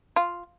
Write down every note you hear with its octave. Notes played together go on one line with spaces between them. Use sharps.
F4